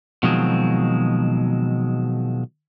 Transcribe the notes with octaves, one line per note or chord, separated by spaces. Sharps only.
B2 D#3 F3 F#3 G#3 C4